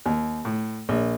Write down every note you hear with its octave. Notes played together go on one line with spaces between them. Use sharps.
D#2
A2
A#1